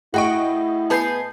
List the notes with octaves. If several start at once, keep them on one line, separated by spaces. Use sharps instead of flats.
A2 E4 F#4 G#4 D#5 G5 C#6 D7
B3 G#4 B4 A5 G6 C7